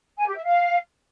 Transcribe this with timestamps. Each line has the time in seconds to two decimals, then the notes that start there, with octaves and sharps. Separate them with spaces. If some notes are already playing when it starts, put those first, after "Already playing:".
0.18 G#5
0.26 G4
0.35 E5
0.44 F5